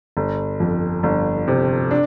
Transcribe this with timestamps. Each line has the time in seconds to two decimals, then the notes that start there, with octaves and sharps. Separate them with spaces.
0.17 G1
0.60 F2
1.03 G1
1.48 C3
1.91 D4